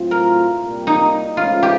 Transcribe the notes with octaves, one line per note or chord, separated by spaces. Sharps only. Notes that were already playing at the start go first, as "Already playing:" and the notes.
Already playing: A2 F#3 A3 C4 F4
A#4
C2 A#2 G3 A#3
D#4
C#2 C#3 F3 A3 F4
G4